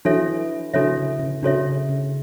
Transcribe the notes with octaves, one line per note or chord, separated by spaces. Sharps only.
E3 D4 F#4 A4 C#5 E5
C#3 D4 F#4 A4 C#5 E5
D3
C#3
C#3 D4 F#4 A4 C#5 E5
C#3
C#3